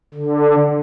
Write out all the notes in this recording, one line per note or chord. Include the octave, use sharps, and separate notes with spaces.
D3